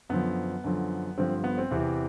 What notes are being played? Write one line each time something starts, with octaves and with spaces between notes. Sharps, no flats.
F#2 D3 F3 B3
F#2 D3 F3
G2 D3 F3 C4
B3
C4
E2 C3 E3